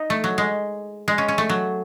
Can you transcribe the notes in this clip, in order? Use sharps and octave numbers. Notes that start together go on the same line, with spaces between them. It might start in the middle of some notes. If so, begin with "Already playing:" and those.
Already playing: D#4
A3
F#3
G#3
G#3
C#4
C#4
A3
F#3